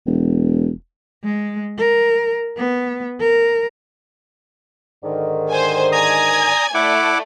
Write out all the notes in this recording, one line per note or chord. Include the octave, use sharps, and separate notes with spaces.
E1
G#3
A#4
B3
A#4
G#2 D3 D#3
C5 G#5
D5 G#5 A#5 D#6 G#6
A3 E4 D5 F#5 D6